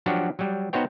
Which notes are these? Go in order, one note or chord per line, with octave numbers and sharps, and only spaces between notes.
F3 F#3 D4 F#4 G4
F#3 G3
B3 D#4 F#4 C5 C#5 G5